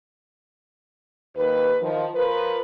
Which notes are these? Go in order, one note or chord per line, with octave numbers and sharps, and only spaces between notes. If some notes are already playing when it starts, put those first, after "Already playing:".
D#2 G4 B4
D#3 F3
F3 A#4 B4